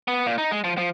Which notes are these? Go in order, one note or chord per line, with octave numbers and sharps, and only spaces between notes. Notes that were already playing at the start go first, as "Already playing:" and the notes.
B3
A#2
D#4
G#3
F3
F3